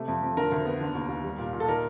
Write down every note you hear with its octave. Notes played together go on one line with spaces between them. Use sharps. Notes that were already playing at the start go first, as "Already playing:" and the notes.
Already playing: C3 A3
F2
F2
D3 A#4
D2
B3
D3
D#2
D#2
G3
A#2
A#2
A4
D#3 A#4